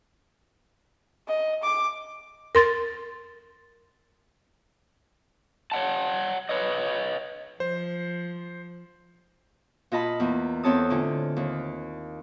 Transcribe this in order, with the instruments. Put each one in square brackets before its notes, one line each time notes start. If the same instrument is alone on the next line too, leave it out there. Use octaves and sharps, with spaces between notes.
[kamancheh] D#5
D6
[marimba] A#4 C6 A6
[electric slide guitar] C#5 D5 F#5 A5
B4 C#5 D#5
[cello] F3 [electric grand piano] C5
[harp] A#2 F4 D#5 A5 B5
E2 A#3
E2 C4 A4 C#5 A5 D#6
A2 D3 F4 G#5
D#2